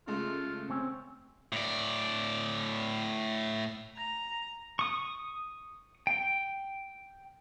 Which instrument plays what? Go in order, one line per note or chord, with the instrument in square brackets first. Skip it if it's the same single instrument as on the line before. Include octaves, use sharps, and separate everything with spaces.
[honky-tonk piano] C#3 G#3 A3 [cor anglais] F4
[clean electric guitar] C4 C#4
[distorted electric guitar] A2 D5
[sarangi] A#5
[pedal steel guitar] C#6 D#6
G5